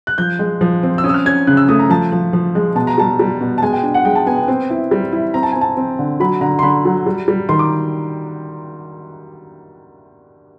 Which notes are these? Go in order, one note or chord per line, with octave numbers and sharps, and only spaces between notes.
F#6
F3 G6
G#3
F3
C4
E6
C#4 D#6
E6
F6
C#4 G#6
C#3 F#6
E6
A3 D#6
A#5
F3 A5
F3
F3
G#3
B2 A5
A#5
G3 A5
G3
B2
A5
G#3 G#5
G5
D4
F#5
G#3 G5
A5
B3 G#5
G5
C4
E4
G3
E4
C4 A#5
A5
C4 G#5
A5
C4
D3
F#3 B5
D3 A#5
C6
D3 B5
F#3
G3
G3
D#3 C6
D6